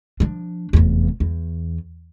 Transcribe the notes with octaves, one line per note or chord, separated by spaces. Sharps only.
F3 D4
F1 E2
E2